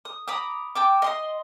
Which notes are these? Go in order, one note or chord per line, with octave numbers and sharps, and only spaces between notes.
D#6
A#5 B5 D6 D#6
G5 A5 D6
D#5 C6 D#6